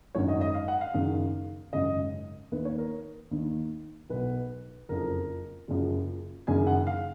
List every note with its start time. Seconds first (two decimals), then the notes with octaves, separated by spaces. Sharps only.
0.15 G#1 F#2 D#3 C#5
0.28 D#5
0.41 D#5
0.54 F5
0.68 F#5
0.81 F5
0.94 F#1 F#2 D#3
1.73 G#1 F#2 C#3 D#5
2.52 D#2 D#3 B4
2.65 C#5
2.78 A#4
3.31 D#2 D#3
4.10 B1 B2 B4
4.89 F#1 F2 F3 A#4
5.68 F#1 F#2 F3
6.47 F#1 F#2 D#3 G#5
6.67 F#5
6.87 F5